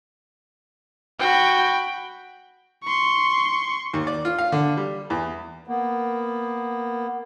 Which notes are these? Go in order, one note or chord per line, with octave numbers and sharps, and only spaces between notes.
F#4 G5 B5
C6 C#6
D#2
D5
F4
F5
D3
G3
E2
A#3 B3